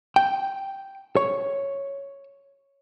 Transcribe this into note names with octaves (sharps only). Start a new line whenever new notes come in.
G5
C#5